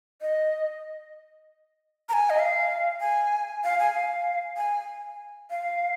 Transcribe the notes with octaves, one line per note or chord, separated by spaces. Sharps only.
D#5
A#5
G#5
D#5
F5
G#5
F5
G#5
F5
G#5
F5